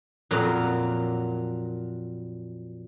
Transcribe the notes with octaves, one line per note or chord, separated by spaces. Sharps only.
F2 A#2 F#3